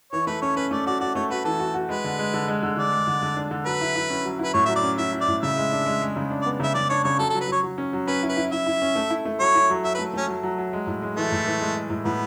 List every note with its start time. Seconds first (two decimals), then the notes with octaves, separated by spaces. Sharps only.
0.13 E3 C#5
0.27 A3 B4
0.42 C#4 C#5
0.56 C#4 B4
0.71 A3 D5
0.86 F#4 D5
1.01 F#4 D5
1.15 A3 C#5
1.30 F#4 B4
1.45 E3 A4
1.59 F#4
1.74 F#4
1.89 G#3 B4
2.04 D3
2.19 G#3
2.34 D3
2.48 G#3
2.63 D3
2.77 D3 D5
2.92 G#3
3.07 D3
3.22 D3
3.36 D4
3.51 D3
3.66 F#3 B4
3.81 E4
3.96 E4
4.10 C#4
4.25 F#3
4.39 E4
4.44 B4
4.54 A2 C#5
4.66 F#3 E5
4.76 D5
4.83 C#4
4.98 E4 E5
5.13 E4
5.21 D5
5.28 A2
5.43 C#3 E5
5.57 G#3
5.72 D4
5.86 G#3
6.02 G#3
6.16 C#3
6.30 D4
6.42 D5
6.46 B3
6.60 C#3 E5
6.74 C#3 D5
6.90 D4 C#5
7.04 C#3 C#5
7.19 F#3 A4
7.30 A4
7.34 F#3
7.41 B4
7.48 F#3 C#5
7.63 F#3
7.78 C#4
7.93 F#3
8.07 C#4 B4
8.23 E4
8.29 B4
8.37 E4
8.52 E4 E5
8.67 E4
8.82 C#4
8.95 A3
9.10 E4
9.25 A3
9.40 F#3 C#5
9.55 E4
9.70 F#3
9.84 F#3 E5
9.95 B4
9.99 A3
10.14 A3 C#4
10.28 F#3
10.43 F#3
10.58 F#3
10.73 G#3
10.87 A2
11.02 G#3
11.16 E3 A3
11.32 A2
11.46 E3
11.61 G#3
11.75 G#3
11.90 A2
12.05 A2 B3